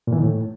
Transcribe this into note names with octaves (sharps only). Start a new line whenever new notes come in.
A#2
E3
D#3
A2